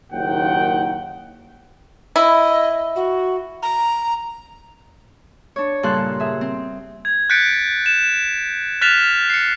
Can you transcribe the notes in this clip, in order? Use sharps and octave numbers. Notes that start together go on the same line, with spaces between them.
F#1 D#2 A#2 D#3 F#5 G5
E4 D#5
F#4
A#5
D4 C#5
G2 A#2 C#3 A4 C6 F#6
G#4 E5
C4
G#6
F#6 G6 A6 B6 C#7 D7
E7
F6 F#6 A6 B6 E7 F7
C7 C#7